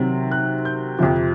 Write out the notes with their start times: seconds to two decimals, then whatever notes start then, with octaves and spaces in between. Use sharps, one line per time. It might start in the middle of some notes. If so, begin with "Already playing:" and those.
Already playing: C3 D#3 F#3 C4
0.32 F#6
0.65 G6
0.99 F2 C3 F3